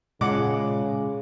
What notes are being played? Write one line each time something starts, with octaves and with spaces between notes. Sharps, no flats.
A#2 C#3 G#3 F#5 D6